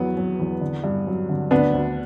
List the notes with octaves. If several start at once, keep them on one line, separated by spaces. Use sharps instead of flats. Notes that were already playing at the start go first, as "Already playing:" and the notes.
Already playing: E2 F#3 B3
F#3
E2
D3
G2
F#3
D3
D2 B3 D4
D2